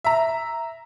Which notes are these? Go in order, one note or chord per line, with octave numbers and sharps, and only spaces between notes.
E5 A#5